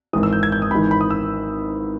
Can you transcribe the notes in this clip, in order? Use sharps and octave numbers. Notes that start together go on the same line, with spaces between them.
G#1 G#2 E3 D#6
E6
G6
G#6
G6
D#6
G#1 G#2 E3 B5
B5
D#6
E6